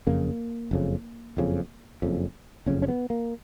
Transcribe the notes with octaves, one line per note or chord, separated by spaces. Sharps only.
F#1 F2 C#3 A#3
F#1 F2 C#3
F#1 F2 C#3
F#1 F2 C#3
F#1 F2 C#3 C#4
C#4
B3
A#3